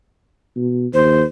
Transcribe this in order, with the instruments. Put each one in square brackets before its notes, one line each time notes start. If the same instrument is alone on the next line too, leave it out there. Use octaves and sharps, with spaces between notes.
[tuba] B2
[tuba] D#2 [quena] C5